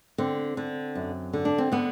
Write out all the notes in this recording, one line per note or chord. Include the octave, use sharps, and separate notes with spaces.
D3 C4
D3
F#2
D3
D4
C4
D3 B3